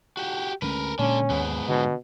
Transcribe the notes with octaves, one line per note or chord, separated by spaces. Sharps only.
F#4 G4
D2 G#3 C#4 A#4 B4
A#2 D3 G#3 C#4
D#2 G#2 B3
B2 D3